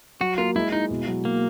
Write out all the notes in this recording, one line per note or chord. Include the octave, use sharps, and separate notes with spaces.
F#3 F#4
A#3 F4
G#3 E4
D#4 E4
B2
F#3
A#3